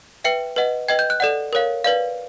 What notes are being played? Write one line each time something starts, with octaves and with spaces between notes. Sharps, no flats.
B4 E5 G5 C#7
B4 D#5 F#5
B4 D#5 G5 G#6
G6
F#6
A4 D5 F#5
A#4 C#5 F5
B4 D5 F5